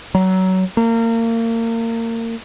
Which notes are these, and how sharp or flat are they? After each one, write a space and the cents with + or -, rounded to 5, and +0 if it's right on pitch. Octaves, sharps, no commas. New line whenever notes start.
F#3 +20
A#3 -30